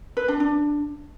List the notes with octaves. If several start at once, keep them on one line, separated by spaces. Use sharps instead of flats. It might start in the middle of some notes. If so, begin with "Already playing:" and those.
B4
D4
D4